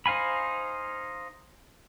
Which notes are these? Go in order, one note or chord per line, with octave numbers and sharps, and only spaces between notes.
D#4 C5 F5 G#5 B5